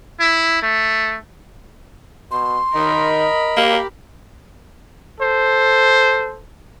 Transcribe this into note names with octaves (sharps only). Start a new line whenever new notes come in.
E4
A3
B2 C6
D#3 A#4 D#5 B5
A#3 G4
A4 C5